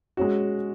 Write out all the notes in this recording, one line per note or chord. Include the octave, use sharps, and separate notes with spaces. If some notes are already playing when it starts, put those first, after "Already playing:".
G#3 C#4 F#4